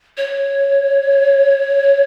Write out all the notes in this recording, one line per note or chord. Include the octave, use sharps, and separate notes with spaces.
C#5